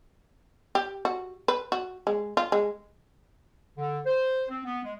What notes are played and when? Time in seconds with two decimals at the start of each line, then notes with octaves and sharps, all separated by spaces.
0.75 G4
1.05 F#4
1.48 B4
1.72 F#4
2.07 G#3
2.37 F4
2.52 G#3
3.77 D3
4.05 C5
4.49 C4
4.64 B3
4.83 G#3